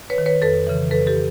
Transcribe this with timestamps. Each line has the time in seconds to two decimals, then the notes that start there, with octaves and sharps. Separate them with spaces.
0.10 B4 C#5
0.18 D#3
0.26 B4 C#5
0.42 F2 A4 B4
0.67 C#3 E3
0.91 F2 A4 B4
1.07 G4 A4